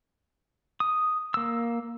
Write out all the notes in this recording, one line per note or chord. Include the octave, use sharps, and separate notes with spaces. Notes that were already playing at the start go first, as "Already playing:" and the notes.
D#6
A#3 E6